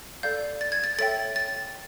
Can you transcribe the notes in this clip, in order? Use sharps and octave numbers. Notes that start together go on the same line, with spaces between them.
A4 D5 F5 G6
A6
G#6
A6
A4 C#5 E5 G5 A6
A6